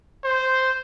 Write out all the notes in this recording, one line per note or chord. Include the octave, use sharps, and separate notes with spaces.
C5